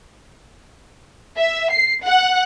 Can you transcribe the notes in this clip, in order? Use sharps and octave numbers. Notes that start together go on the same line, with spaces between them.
E5
C7
F#5